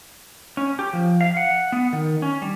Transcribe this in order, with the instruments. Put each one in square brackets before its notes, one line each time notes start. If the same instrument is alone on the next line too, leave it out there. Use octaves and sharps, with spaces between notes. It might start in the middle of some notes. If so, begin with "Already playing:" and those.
[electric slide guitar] C#4
G4
F3
F5
F#5
B3
D#3
C#4
G3